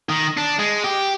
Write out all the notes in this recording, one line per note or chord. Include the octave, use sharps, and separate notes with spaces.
D#3
D4
G#3
G4